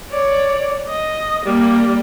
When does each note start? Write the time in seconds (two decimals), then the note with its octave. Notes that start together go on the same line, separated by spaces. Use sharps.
0.12 C#5 D5
0.89 D#5
1.46 G3 A#3